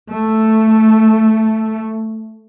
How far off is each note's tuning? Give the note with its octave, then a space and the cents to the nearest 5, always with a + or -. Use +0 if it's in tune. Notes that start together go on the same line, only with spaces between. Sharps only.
A3 +0